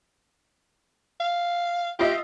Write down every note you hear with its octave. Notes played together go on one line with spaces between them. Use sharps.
F5
F4 G4 D#5 E5